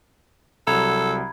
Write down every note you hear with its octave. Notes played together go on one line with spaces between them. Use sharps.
C2 F#3 A4 A#5 B5 G#6